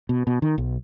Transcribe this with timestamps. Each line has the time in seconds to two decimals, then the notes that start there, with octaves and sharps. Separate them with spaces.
0.09 B2
0.27 B2
0.42 D#3
0.58 B1